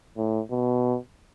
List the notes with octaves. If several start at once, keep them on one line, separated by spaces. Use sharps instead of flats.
A2
B2